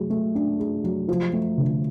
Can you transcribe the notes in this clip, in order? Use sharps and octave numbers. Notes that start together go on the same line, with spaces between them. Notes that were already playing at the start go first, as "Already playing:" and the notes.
Already playing: F#3 A3 G#4
A3
D4
G#4
F#3
F3
A3
D3